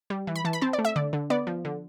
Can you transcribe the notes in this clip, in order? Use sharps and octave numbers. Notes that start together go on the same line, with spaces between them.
G3
E3
B5
E3 A5
B5
C4 A5
D5
A3
E5
D3 D5
D3
B3 D5
F3
D3